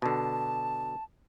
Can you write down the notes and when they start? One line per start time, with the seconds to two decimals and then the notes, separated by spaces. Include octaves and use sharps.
0.02 B2 D3 A5